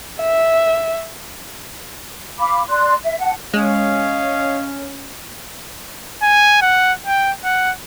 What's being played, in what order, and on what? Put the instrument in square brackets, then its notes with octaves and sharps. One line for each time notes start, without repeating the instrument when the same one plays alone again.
[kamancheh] E5
[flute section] F5 B5 D6
D5 C6 F#6
E5
F#5 A5
[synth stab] G#3 [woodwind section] C#4 [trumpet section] C#5 D#5 F5
[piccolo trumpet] G#5
F#5
G5
F#5